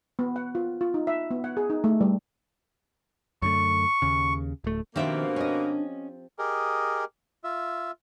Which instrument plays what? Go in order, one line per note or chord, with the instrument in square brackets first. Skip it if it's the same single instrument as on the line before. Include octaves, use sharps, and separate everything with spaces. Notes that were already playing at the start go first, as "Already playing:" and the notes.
[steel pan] B3
F#5
F4
F4
D#4
E5
B3
F#5
G#4
D#4
A3
G3
[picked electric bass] F#2 D3 A3 [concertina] C#6
[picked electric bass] D#2 C#3
D1 A3
[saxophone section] B2 A#3 [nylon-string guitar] D#3 E5 [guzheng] F3 C4 G4 [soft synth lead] D4
[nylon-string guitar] C#4 D#5
[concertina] G4 G#4 A#4 D#5
F4 E5